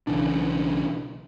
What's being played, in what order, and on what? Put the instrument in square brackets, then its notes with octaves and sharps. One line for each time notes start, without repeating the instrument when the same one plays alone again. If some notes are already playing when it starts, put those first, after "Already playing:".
[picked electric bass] B1 C#3 E3 D4